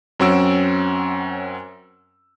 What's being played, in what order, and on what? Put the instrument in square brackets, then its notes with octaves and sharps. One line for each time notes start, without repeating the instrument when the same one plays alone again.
[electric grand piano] F#2 C4 C#4 F#4 E6 D7